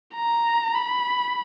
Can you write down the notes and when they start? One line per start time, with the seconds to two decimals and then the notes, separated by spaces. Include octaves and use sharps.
0.15 A#5
0.75 B5